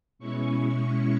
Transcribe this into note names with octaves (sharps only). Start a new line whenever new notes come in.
B2 G#3 C#4 E4 C#6